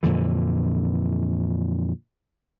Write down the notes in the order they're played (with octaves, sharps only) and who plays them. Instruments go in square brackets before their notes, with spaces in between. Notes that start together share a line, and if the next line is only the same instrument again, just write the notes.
[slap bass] F2 A#2 D3 E3